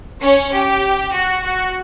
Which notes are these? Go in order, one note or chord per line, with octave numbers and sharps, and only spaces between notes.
C#4 C#5
G4
F#4
F#4